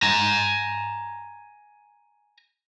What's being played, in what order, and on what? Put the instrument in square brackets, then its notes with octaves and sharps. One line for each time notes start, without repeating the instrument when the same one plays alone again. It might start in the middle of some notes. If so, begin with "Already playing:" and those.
[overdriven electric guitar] G#5 A#5